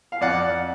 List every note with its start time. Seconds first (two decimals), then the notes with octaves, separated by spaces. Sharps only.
0.12 F5
0.21 F2 D5 F#5